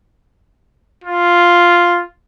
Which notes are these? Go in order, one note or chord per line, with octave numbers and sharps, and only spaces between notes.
F4